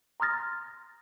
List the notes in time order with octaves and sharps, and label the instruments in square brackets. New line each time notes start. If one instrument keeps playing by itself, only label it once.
[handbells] A#5 C6 D#6 F6 A6 A#6